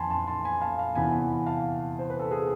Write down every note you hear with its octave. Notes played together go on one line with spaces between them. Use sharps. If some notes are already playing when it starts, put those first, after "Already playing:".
Already playing: F2 E3 G#5 A5 B5 C6
A5 C6
A5 C6
G#5 B5
F5 A5
F5 A5
E2 C3 E3 G#5 B5
F5 A5
C5
B4
A4
G#4 B4